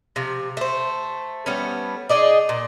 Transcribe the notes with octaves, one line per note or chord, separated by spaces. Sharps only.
C3 F3
A3 C5
G3 A3 B3 C#4
D#4 G#4 D5 D#5
A#2